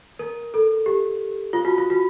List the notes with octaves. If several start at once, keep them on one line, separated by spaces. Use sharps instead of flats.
A#4
A4
G4
F4
F#4
F4
F#4